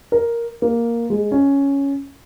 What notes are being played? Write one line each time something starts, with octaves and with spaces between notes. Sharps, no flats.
A#4
A#3
G#3
C#4